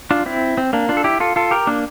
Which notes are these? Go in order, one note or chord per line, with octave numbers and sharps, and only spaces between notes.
D4 F4
C4 E4
C4
A#3 D4
D4 F4
A4
E4 G4
F4 A4
F4 A4
G4 A#4
A#3 D4